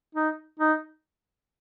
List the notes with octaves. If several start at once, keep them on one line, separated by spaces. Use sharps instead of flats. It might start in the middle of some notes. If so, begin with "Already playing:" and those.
D#4
D#4